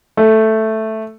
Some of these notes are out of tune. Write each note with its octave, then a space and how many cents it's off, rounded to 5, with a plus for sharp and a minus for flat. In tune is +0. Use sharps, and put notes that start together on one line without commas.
A3 +0